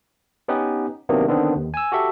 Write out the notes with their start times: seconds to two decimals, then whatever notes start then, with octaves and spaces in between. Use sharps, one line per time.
0.48 B3 C#4 D#4 G4 B4
1.09 C3 D#3 F#3 A#3 B3 D4
1.28 D3 D#3 B3 C4 D4
1.56 D#2
1.74 G#5 E6
1.92 F#4 G4 A4 E5